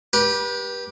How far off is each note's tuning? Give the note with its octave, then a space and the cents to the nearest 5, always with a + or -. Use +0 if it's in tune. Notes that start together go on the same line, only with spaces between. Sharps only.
G4 +0 B4 -35